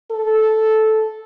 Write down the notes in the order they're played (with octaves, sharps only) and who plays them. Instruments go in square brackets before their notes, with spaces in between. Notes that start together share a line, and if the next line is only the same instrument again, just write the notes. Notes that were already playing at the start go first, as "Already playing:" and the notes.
[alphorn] A4